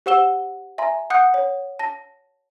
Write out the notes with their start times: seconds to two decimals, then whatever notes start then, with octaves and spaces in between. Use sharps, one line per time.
0.06 G4 C5 F#5 E6 E7 G7
0.78 E5 G#5 A#5 C6
1.10 F#5 D#6 F#6 G6 C#7
1.34 C#5
1.79 A5 A#6